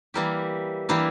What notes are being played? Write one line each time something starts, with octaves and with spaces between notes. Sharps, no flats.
E3 G3 A#3 E4 G4
E3 G3 A#3 E4 G4